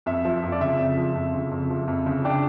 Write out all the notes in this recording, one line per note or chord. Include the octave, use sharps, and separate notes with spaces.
F2 E5
F3
F2
D5
C#3 E5
F2
F3
F2
C#3
F2
F3
F2
C#3
D4 G5